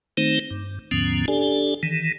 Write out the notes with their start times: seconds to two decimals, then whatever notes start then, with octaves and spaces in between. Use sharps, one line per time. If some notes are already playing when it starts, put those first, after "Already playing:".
0.17 D#3 A3 C4 D#4 C5
0.51 G2
0.91 D#2 G#2 D3 F3 B3 C#4
1.28 D4 G4 A4 D5 G#5
1.83 D#3 E3